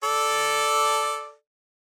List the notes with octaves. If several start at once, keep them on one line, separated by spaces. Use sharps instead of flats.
A4 D5